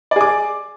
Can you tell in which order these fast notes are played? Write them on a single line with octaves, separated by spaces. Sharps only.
D5 G#4 D6